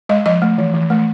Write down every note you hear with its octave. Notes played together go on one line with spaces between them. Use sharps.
G#3 D#5
F3 D#5
A3
E3
E3
A3